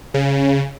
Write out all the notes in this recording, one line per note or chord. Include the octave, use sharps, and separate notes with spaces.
C#3